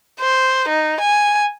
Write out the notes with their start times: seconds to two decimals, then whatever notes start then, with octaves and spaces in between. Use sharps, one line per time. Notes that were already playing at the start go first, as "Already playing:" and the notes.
0.20 C5
0.69 D#4
1.01 G#5